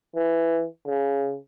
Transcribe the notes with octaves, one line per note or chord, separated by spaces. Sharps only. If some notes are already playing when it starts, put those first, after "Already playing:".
E3
C#3